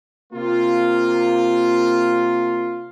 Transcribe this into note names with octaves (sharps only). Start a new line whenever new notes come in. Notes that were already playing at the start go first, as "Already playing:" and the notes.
C3 A#3 F4